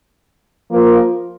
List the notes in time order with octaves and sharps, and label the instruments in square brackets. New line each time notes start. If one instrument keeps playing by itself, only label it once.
[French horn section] F3 A#3 F4 A#4